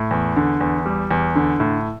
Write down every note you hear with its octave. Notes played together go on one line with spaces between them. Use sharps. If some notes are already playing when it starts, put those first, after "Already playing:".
Already playing: A2
E2
D3
E2
G3
E2
D3
A2